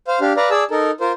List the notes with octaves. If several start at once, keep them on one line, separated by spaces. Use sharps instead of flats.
C5 F5
D4 G4 F5
B4 D5 F5 A#5
G#4 D5 A5 E6
D#4 A4 A#4
F4 A#4 C5